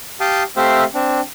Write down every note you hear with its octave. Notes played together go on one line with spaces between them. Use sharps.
G4 F5 G5 A5 D#6
A3 C4 G4 C5 E5 F5
C4 D4